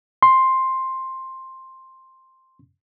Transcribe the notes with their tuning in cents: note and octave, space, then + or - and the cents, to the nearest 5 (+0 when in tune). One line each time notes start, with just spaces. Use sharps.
C6 +5